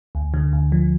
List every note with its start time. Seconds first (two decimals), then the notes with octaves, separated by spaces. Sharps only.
0.15 D2
0.34 D3
0.53 D2
0.72 F3